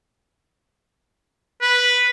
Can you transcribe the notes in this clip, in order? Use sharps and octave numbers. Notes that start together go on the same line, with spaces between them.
B4